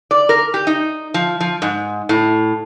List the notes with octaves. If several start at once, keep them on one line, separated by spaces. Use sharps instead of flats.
D5
A#4
G4
D#4
F3
F3
G#2
A2